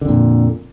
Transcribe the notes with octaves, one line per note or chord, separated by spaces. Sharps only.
F2 A#2 D3